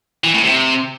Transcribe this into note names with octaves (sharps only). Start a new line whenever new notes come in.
E3
A2
C3